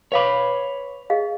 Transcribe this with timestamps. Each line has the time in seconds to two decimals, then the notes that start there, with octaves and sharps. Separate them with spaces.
0.12 B4 C#5 F5 B5 D6
1.10 G#4 D#5 F5